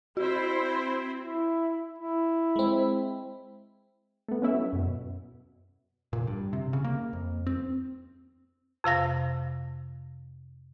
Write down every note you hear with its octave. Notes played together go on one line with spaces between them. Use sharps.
C4 E4 F#4 C5
E4
E4
G#3 C4
A3 B3
B3 C#4 E4 E5
F#3
F#2 B2
A#2
G2
C3
C#3
A#3
F2
C4
F2 C3 F5 A#6